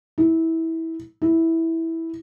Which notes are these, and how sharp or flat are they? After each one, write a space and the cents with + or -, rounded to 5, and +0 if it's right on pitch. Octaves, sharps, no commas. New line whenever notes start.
E4 -20
E4 -10